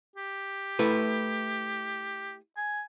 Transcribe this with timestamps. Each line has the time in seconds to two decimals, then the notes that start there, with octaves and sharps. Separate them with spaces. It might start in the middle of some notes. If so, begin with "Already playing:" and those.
0.16 G4
0.79 A3 E4 B4
2.57 G#5